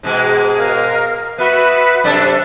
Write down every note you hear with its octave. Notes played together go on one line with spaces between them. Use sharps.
G#2 B2 G#3
A#4 F5
B3 F#4 B4 E5
F#2 C3 D4 A4